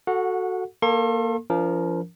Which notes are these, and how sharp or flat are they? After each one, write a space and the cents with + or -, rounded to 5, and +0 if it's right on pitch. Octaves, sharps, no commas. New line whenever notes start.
F#4 +0 A4 +0 F#5 -25
A#3 +0 A4 +25 C6 +45
F3 -25 D4 -45 A#4 +0